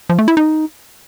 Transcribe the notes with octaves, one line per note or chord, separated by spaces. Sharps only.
F3
A3
E4
D#4